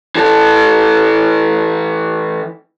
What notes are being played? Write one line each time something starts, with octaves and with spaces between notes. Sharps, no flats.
E3 A4